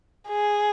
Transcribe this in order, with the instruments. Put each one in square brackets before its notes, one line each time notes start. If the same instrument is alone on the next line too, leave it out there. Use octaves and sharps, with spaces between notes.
[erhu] G#4